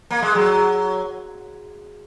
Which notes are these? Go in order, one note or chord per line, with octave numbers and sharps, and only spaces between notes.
A#3
G#3
F#3